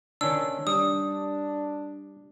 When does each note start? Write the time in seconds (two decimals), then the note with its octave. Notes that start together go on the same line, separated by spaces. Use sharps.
0.21 D#3 C#4 D4 E6
0.67 G3 D4 D#6